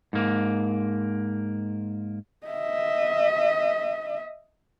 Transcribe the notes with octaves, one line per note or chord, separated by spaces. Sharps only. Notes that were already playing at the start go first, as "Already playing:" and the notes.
G#2 A#3
D#5 E5